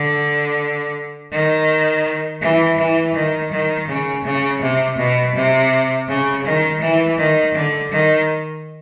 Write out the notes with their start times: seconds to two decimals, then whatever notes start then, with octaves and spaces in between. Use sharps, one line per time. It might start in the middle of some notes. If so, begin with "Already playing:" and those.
Already playing: D3
1.31 D#3
2.41 E3
2.78 E3
3.15 D#3
3.52 D#3
3.88 C#3
4.25 C#3
4.62 C3
4.98 B2
5.35 C3
6.08 C#3
6.44 D#3
6.81 E3
7.18 D#3
7.55 D3
7.91 D#3